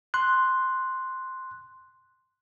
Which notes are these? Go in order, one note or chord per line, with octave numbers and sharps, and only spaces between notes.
C6 F#6